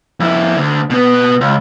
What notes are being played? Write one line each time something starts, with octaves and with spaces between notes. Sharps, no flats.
F2 E4
D2 D3
B2 B3
C#2